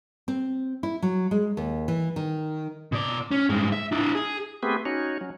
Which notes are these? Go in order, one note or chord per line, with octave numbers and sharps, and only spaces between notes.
C4
E4
F#3
G#3
D#2
E3
D#3
B2 D5
C#4
G2 G#3
E5
D4 E4
G#4
A3 B3 C4 G4 G#4 B4
C#4 D#4 F#4 C#5
F#3 C#4